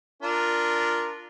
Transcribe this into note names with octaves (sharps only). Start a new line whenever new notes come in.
D4 F4 A#4